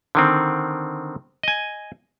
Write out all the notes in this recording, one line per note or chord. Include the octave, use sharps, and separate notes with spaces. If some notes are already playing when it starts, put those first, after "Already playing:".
D3 D#3 C4
D#5 G#5